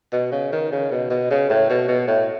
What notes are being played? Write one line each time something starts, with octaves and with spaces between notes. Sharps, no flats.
B2
C#3
D#3
C#3
B2
B2
C#3
A2
B2
B2
A2